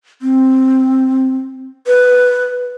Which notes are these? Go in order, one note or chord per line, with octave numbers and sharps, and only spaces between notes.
C4
B4